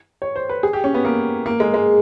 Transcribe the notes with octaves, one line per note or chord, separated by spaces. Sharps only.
C#5
C5
B4
G#4
G4
C#4
B3
A#3
A#3
G#3
G#3